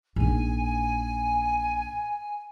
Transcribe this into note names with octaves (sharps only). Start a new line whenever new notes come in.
A#1 D#4 G#5